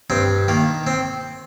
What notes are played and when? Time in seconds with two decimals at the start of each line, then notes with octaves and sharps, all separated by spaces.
0.10 G2 C4
0.48 D#3 A#3
0.87 C4